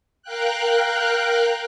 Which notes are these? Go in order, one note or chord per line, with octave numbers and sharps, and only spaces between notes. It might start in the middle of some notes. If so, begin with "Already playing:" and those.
A#4 F5 G5 F#6